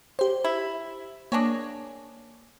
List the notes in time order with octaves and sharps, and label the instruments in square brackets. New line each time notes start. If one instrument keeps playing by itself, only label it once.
[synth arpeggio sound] G4 C5
[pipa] E4
[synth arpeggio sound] A#3 [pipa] D4 G#4 C#5